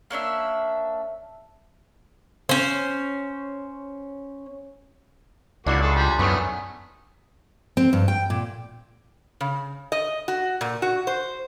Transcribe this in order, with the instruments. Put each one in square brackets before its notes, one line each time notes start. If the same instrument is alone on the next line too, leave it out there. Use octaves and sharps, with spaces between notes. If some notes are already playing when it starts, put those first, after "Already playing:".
[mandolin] A#3 C#4 D4 E5
[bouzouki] C#4 C5
[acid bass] C#2 [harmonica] A#3 F#4 [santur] D4 E4 E5
[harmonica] G#4 A4
[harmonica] F3 G3 [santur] G#5 C6
[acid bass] F#2 [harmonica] D#3 F#3 A3 [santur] B3
[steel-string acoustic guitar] C4
G2
G5
A#2
[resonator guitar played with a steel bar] C#3
D#5
F#4
A#2
F#4
C5